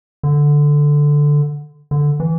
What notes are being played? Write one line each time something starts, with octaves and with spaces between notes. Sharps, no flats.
D3
D3
E3